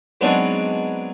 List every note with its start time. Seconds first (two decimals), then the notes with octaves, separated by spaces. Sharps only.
0.21 F#3 G#3 B3 C4 D4 D#4